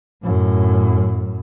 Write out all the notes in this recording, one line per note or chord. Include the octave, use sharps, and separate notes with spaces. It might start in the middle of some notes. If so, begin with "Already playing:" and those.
F#2 A2